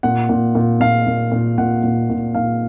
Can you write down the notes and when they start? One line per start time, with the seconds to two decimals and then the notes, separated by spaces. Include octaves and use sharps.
0.03 A#2 F#5
0.29 A#2
0.55 A#2
0.80 A#2 F5
1.07 A#2
1.32 A#2
1.58 A#2 F#5
1.83 A#2
2.10 A#2
2.35 A#2 F5